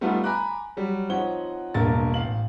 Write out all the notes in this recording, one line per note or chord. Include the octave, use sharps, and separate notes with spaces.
G3 A3 B3 D#4 F4
G#5 A#5 B5 D6 F#6
F#3 G3
F3 C4 D#4 C#5 F#5 G7
E1 G2 A#3 A#4 A6
A1 F5 F#7